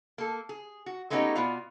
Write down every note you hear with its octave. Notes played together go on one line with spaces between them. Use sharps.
A#3 A4
G#4
F#4
G#3 A3 B3 C#4 D#4 G4
B2 B3 F4 D5 F5